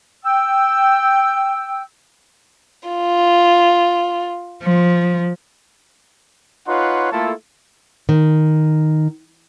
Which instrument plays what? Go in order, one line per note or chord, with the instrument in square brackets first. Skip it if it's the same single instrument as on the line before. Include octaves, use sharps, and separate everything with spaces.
[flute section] G5 E6
[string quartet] F4
F3
[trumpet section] D#4 F4 B4 C#5 F#5 C6
A3 A#3 E4 F4 A4
[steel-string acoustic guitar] D#3